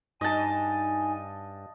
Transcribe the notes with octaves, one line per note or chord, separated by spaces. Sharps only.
G2 D#4 D#5 G#5 A5